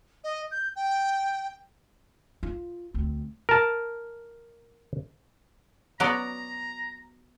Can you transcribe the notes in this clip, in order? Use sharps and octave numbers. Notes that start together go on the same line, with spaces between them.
D#5
G6
G5
F4
D2 C4
A#4 A5
F#3 B3 D5 A#5